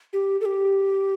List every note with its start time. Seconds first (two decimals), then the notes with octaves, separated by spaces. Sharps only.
0.13 G4
0.41 A4
0.45 G4